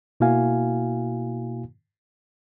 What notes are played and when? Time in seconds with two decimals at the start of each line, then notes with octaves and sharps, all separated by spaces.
0.20 B2 A#3 E4 F#4 F5 G#5